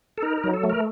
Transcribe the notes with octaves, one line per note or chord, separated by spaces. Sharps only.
A4
D#4 A#4
A#4
F#3
A4
A3
A#4